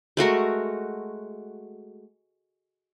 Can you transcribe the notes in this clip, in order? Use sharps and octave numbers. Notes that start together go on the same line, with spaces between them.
G#3 A3 F#4 A#4